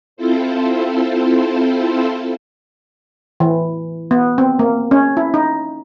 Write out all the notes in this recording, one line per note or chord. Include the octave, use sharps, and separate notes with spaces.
C4 E4 F4 A4 C5
E3
B3
C4
A#3
C#4
E4
D#4